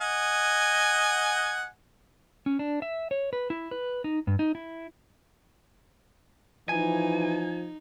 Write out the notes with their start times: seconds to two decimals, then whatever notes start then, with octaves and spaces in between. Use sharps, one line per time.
0.01 D#5 F#5 G#5
2.46 C#4
2.59 D4
2.82 E5
3.11 C#5
3.33 B4
3.50 E4
3.71 B4
4.04 D#4
4.27 G2
4.39 D#4
4.55 E4
6.69 E3 F3 D#4 G#5